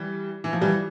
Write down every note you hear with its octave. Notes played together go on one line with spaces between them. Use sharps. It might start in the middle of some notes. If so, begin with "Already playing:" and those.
Already playing: E3 G3
E3
F3
E3 G3